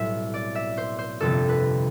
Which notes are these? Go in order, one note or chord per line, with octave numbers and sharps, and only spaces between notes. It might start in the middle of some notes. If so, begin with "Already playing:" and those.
Already playing: B1 A2 G3 C4 E5
D5
E5
C5
C5
G1 F2 C3 A4
B4